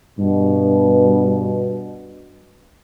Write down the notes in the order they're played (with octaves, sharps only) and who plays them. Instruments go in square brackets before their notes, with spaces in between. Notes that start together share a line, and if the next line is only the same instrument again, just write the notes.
[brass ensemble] G2 B2